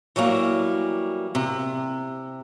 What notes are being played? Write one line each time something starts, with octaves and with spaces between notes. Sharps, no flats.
E3 F#3 G3 A#3
C3